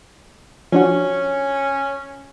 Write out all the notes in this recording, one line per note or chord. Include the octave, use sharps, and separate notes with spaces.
F3 C#4 D4 F#4